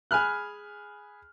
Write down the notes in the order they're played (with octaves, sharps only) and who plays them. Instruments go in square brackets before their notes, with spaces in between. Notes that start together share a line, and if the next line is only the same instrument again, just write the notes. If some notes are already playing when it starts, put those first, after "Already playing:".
[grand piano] G#4 G#5 B5 F6 F#6